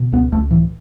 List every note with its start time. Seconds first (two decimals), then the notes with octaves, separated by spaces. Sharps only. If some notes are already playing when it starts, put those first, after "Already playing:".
Already playing: B2
0.12 C#2 B3
0.32 C#2 A3
0.51 A2 E3